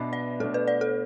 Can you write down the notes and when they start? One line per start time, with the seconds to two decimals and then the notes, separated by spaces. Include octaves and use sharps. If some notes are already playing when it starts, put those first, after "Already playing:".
Already playing: B2 B3 D4 B4 D5 E5
0.13 D5
0.40 B2 A3 D4 A4
0.54 B4
0.68 D5
0.81 A4